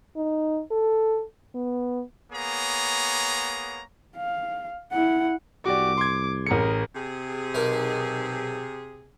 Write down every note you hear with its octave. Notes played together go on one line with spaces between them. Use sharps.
D#4
A4
B3
A#3 B3 G#4 C#5 A#5
F5
E4 F#5
C2 F#4 G4 D5 D6
C6 G#6
A1 G#4 A#4 C#7
C3 G#4
B1 D#4 A#4